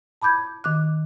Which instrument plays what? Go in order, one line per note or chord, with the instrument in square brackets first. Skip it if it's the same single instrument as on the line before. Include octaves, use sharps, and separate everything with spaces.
[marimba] A5 B5 D6 G6 G#6
D#3 D6 F#6